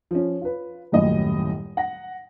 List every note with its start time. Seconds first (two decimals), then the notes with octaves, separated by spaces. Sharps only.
0.11 F3 C#4
0.42 F4 B4
0.92 D#1 F#2 A2 D#5
1.77 F#5 A#6